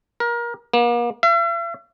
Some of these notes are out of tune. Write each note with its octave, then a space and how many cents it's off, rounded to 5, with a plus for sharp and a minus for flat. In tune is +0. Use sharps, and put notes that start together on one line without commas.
A#4 +25
A#3 +40
E5 +45